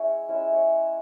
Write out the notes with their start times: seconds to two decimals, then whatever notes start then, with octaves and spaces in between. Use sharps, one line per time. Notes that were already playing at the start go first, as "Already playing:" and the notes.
Already playing: G#3 C#4 E4 C#5 E5
0.29 G#3 C#4 E4 E5
0.51 C#5